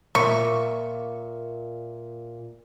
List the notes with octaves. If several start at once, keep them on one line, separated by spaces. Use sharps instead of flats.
A#2 A#3 E5 C#6